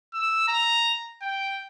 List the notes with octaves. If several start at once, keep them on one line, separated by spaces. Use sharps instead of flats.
E6
A#5
G5